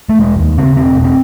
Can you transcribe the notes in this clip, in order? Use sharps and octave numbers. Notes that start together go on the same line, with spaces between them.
A3
E1 G#3
D#2
C#3 C4
E1 C4
E1
C4